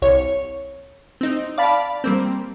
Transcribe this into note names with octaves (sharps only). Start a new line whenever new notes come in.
C2 C#5
C4 D#4
D5 F5 A5 B5
G3 A#3 C4